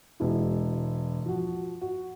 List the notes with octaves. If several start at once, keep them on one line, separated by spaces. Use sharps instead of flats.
E1 G#3 E4
F3 F#4
F#4